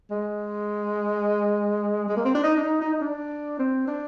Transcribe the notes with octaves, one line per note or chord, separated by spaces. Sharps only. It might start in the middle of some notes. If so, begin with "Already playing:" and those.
G#3
G#3
A#3
C4
D4
D#4
D4
D#4
D#4
D#4
D4
C4
D4